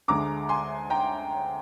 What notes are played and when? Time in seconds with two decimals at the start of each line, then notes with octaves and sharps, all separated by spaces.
0.08 D2 D3 G#3 A#5 D6
0.49 G#5 C6
0.90 G5 A#5